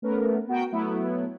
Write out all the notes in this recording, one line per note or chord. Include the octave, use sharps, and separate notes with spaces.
A3 B3 C#4 A#4
B3 F#4 A#4 G5
F#3 A3 B3 E4